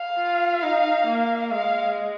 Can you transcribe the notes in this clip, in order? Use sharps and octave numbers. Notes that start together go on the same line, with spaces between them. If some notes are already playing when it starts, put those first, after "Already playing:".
Already playing: F5
F4
D#4
A#3
G#3 F5